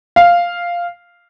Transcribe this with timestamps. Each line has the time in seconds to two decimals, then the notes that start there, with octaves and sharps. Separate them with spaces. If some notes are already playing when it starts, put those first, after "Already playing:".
0.16 F5